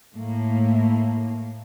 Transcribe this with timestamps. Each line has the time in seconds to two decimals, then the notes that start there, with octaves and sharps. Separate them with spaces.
0.15 A2 A#3